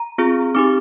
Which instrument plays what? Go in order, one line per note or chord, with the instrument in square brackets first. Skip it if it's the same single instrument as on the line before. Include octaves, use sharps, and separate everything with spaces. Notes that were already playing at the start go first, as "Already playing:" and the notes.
Already playing: [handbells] A#5
C4 F4 G#4
C4 D#4 G4 D6